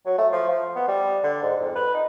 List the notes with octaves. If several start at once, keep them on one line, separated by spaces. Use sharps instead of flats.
F#3
A3
F3
F3
B3
G3
D3
G#2
F2
B4
D#4